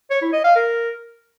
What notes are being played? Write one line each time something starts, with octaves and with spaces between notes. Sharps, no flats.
C#5
E4
D#5
F5
A#4